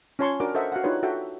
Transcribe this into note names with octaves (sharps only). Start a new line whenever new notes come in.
C#4 F4 C#5 A5 C6 C#6
D4 F#4 A#4 D6
A4 A#4 C5 D#5 E5 F#5
F#4 F5 F#5
D4 D#4 F4 G4 B4 C#5
F#4 A4 E5 G5